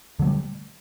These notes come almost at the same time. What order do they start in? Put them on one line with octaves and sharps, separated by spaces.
D3 F#3 A3 G3